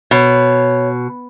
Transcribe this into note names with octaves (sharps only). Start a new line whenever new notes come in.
B2 C#5